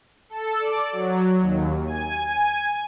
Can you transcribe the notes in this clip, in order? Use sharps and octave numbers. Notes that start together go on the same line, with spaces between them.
A4
D5
F#3
D#2
G#5